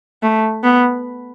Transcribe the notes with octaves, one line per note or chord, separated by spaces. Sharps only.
A3
B3